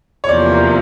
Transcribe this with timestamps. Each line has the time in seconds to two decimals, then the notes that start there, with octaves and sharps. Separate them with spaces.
0.24 C#5
0.29 E2 C3 F3 A#3 D5